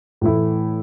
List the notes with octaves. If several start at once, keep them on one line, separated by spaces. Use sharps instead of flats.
A2 E3 A3 E4